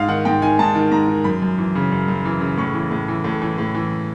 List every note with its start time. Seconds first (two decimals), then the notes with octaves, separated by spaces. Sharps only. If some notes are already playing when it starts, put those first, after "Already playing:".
Already playing: G#2 F5
0.08 D#3 F#5
0.25 G#2 G5
0.42 D#3 G#5
0.59 G#2 A5
0.75 D#3
0.91 G#2 A#5
1.08 D#3
1.24 F#2 B5
1.42 F#2
1.58 E3
1.75 C#3
1.91 F#2
2.08 F#2
2.25 E3
2.41 C#3
2.57 A2 C#6
2.74 E3
2.91 A2
3.08 E3
3.24 A2
3.42 E3
3.58 A2
3.74 E3